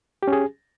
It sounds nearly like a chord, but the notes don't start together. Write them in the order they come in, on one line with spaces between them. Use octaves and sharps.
G4 C#4 G#4